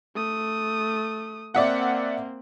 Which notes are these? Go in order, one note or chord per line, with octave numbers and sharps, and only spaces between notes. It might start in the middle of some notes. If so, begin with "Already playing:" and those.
A3 D#6
A#3 C4 D5 E5 F#5